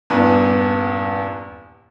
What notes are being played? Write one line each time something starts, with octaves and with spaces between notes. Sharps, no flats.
D#1 E2 G2 B4